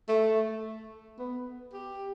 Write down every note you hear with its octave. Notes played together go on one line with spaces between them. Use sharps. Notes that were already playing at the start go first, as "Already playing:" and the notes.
A3
B3
G4